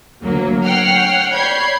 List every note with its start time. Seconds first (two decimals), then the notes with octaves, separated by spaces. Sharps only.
0.23 D2 F#3 A#3
0.64 C#5 F#5 G5 F6 C7
1.33 C#5 D5 B5 G6 G#6 C7